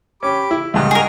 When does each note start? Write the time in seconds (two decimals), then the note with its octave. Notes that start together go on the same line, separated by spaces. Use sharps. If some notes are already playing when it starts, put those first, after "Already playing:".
0.23 C#4 G4 B5 D6
0.51 E4
0.74 C#2 G2 A#2 F#4 D#5 G5
0.91 G#4 A#4